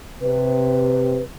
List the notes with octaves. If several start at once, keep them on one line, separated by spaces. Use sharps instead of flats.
C3 B4